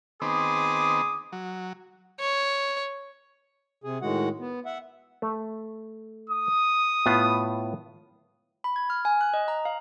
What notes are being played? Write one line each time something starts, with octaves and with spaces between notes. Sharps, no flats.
D#3 B3 C4 G#4 D6 D#6
F#3
C#5
C3 G#4
A2 D#3 G#3 F#4 F#5
B3
E5 F#5
A3
D#6
A2 B3 F4
B5
G#6
F6
G#5
F#6
D#5
A#5
F5